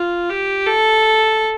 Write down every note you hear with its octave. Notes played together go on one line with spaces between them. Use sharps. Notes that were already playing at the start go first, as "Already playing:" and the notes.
Already playing: F4
G4
A4